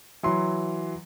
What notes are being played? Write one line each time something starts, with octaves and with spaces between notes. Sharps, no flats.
E3 F#3 C6